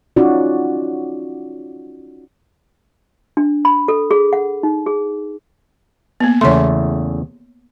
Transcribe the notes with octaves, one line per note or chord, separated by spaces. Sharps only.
C#4 D#4 F4 F#4 D5
D4
B5
A4
G#4
F#5
D#4
G#4
A#3 B3
E2 C#3 A3 C#5 C6